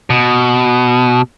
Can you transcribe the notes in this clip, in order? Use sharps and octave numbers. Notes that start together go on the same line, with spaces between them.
B2